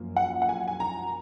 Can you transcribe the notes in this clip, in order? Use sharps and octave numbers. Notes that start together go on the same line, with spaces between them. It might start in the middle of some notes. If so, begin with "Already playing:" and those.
Already playing: F#2 F3 A#3
F#5
F#5
G#5
G#5
A#5